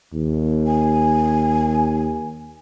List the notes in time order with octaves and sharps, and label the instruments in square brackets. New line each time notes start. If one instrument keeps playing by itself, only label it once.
[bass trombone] D#2
[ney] G#5